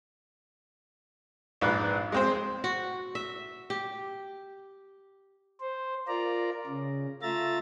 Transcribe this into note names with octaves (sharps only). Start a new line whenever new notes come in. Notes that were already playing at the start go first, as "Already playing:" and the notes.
A#1 G#2 B4
G#3 C4 C5
F#4
E5
G4
C5
F4 A#4 D5 A#5
C#3
A3 F4 E5 A#5 A6